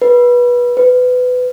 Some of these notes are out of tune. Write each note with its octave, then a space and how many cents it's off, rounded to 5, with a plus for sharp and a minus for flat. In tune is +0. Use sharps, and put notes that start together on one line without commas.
B4 -20
B4 +20